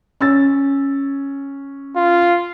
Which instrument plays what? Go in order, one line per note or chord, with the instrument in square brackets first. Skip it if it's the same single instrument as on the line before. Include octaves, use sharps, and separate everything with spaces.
[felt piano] C#4 E6 A6
[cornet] F4